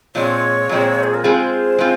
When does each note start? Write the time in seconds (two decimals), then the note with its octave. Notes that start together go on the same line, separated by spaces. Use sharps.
0.15 A#2 F3 G#3 C4 C#5
0.69 A#2 F3 G#3 C4
1.04 G#4
1.14 A#4
1.24 G#3 C4 F4 G#4 C5
1.78 G#3 C4 F4